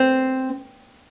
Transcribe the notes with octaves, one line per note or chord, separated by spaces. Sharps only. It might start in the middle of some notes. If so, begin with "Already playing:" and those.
Already playing: C4